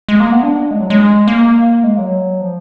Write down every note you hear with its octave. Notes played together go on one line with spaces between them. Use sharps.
G#3
A#3
B3
D4
G#3
F#3
G#3
A#3
G#3
F#3
F3